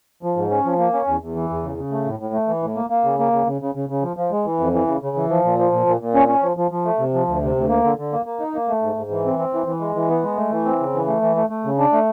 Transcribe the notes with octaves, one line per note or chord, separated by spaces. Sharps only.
F3
G#2
C#4
F3
A#3
C#4
E2
E2
E3
E2
C#3
C#3
A3
A2
A2
A3
E3
A2
A#3
A#3
C#3
A#3
C#3
C#3
C#3
C#3
C#3
F3
F3
G#3
E3
F2
E3
C#3
C#3
E3
F3
A#2
F3
A#2
A#2
A#2
C#4
C#4
F3
F3
F3
A3
C3
F3
D2
C3
D2
A#3
D3
D3
A#3
A#3
D#4
A#3
A3
G#2
G#2
E3
C4
C4
E3
E3
G#3
E3
B3
G#3
A3
E3
C4
C#3
E3
A3
E3
A3
A3
C#3
D4
A3